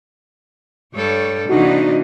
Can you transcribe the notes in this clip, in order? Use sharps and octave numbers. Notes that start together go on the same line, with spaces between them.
G2 G3 A4 C#5
C3 E3 A#3 D4 D#4 F#4